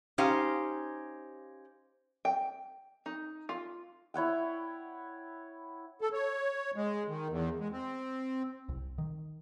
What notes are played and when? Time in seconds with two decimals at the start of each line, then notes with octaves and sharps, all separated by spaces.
0.18 C#4 D#4 G4 C5 F5
2.25 G5
3.06 D#4
3.49 F4
4.14 E4 C#5 F#5 G5
6.01 A4
6.13 C#5
6.76 G#3
7.08 D#3
7.29 E2
7.60 G#3
7.72 C4
8.69 C2
8.98 D#3